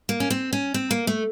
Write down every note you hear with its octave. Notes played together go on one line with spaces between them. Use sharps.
A#3
C#4
C4
C#4
C4
A#3
A3